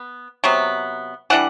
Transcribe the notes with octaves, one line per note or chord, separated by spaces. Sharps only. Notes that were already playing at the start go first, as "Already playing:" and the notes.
Already playing: B3
C3 F#3 B3
E3 G3 D4 F#5